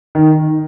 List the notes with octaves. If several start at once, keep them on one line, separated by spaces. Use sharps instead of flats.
D#3